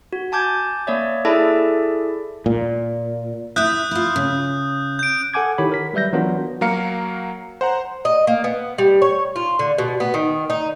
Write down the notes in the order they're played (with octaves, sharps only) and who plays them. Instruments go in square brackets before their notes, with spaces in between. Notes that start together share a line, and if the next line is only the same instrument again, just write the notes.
[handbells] F#4
G#5 A5 D6 G6 G#6
A#3 C#5 D5 E5
E4 G#4 A4 D5 E5 A5
[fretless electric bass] A#2
[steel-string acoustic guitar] E4 E5 [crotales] D#6 F#6 G6
[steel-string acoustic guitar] E4 F4
C#3
[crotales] G6 D7
[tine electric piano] A4 F#5 G#5 D6 G#6
D#3 E4 G4 C#5 B5
A#4 B6
F#3 G3 B4 E5 G6 A#6
E3 F#3 B3 D4 F4 A#4
[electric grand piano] F#3 A#3 A#4 F5 C#7
C5 F#5 A#5
[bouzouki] D#5
A#3
B3
G3
C#5
F4
D3
B2
B3
D#3
D#4